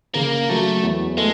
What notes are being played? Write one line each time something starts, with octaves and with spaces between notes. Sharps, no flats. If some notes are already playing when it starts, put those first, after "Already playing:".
C#3 A#3
F#3 A3
E2
G#3 A3